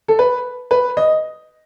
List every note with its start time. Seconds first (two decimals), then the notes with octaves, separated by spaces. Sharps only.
0.08 A4
0.19 B4
0.71 B4
0.97 D#5